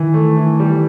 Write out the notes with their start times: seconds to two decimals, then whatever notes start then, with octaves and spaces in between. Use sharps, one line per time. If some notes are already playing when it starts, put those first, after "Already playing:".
Already playing: D#3 E3
0.14 A3
0.37 E3
0.60 G3